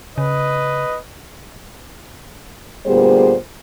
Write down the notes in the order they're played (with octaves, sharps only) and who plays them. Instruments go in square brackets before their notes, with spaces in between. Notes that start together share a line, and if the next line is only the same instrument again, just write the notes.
[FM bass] C#3 [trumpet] B4 [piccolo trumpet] D#5
[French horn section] D2 A#2 G3 B3 G#4 C5